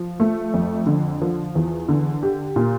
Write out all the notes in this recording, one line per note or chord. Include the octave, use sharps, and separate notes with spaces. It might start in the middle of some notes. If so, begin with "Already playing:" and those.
Already playing: F3
A3
F2
D3
F3
E2
D3
G4
A#2